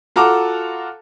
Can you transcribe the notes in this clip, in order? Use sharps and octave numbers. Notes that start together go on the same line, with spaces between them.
F4 F#4 A4 A5 A#5 D6